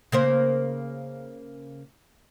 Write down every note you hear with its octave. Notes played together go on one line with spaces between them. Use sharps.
C#3 A#3 C5